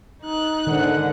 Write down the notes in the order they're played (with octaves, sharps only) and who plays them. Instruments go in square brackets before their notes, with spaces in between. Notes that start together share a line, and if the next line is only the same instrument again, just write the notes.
[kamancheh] D#4 F#6
[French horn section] G#2 D3 [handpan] D#3 [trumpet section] F#5